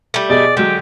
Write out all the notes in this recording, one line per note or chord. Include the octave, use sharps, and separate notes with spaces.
G3 A3
B2 G#4 D5 D#5
D3 F#3 G#3 G4